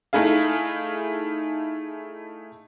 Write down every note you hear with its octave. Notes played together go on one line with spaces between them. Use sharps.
A3 D#4 E4 G#4 F5